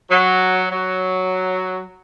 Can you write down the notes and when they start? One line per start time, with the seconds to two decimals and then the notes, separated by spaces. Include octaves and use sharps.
0.10 F#3
0.72 F#3